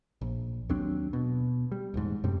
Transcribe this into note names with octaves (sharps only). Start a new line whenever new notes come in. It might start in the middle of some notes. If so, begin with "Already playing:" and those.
A#1
D#2 F#3 C4 D4
B2
G3
D#1 E2 G#2
F#2 A2 C3 G3